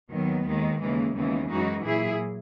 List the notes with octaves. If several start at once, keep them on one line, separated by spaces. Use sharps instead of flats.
D#2 D#3 F#3 B3
D#2 D#3 G#3
D#2 C#3 E3 G#3 A#3
D#2 C#3 E3 G#3 B3
F#2 E3 G#3 D#4 F#4
A#2 F#3 E4 G#4